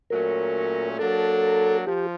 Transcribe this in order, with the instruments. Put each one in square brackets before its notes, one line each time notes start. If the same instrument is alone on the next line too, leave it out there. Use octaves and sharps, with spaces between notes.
[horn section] A#2 F#3 A3 C#4 [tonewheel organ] A#4
[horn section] F#3 A#3 D4 [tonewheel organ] A4
[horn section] F3 [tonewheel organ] G4